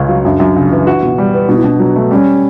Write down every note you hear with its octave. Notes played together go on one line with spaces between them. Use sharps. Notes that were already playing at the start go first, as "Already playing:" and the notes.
Already playing: C#2 C#3 C#4
F#3
F#2 D4
F#2
C#3
E3
F#4
B2
G3
B3
B2 D4
E4
B2 D4
F#3
A3
G3 C#4